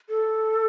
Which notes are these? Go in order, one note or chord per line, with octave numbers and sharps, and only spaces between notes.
A4